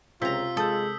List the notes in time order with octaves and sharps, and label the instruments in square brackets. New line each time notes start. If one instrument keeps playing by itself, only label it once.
[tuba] C#2 [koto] C3 A#5 [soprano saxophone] F4 [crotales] E6 B6
[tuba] G#3 [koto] A4 [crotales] D#6 G6